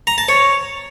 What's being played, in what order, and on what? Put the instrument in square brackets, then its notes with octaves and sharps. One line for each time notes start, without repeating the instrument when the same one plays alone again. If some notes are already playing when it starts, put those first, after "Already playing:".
[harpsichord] A#5
A5
C#5